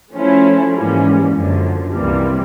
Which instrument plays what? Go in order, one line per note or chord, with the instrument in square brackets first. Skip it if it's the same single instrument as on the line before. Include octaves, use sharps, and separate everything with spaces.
[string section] F3 A3 C#4 E4
G#2 E3 G3 A#3 C#4
F#2 D3 F3
C2 C3 E3 G3 A#3